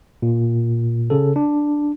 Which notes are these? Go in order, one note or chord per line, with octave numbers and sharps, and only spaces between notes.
A#2
C#3 A4
D4